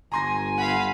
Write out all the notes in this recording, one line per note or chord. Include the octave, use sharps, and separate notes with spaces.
G1 G#5 A#5 C6 A#6
F5 F#5 B5